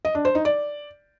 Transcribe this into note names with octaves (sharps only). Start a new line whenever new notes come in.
D#5
D4
C5
D#4
D5